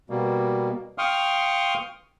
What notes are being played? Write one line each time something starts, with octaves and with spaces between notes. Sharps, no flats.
B2 G3 A#3
F5 G5 C6 C#6 D#6 F6